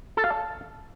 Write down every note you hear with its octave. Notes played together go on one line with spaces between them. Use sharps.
A4
F5
A5